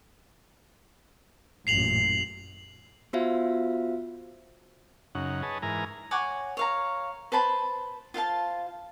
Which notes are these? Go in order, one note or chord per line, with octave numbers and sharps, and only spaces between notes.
A1 F#2 A#2 C7 F7 F#7
B3 F4 F#4 C5 E5 F5
F#2 C#3 D#4 F#5
G#4 B4 C#5 D#5 A5
G#2 E3 A#4 G#5 A#5
C#5 F#5 G#5 D6
C#5 F5 A#5
B4 C5 A5 B5
F4 C5 F5 A5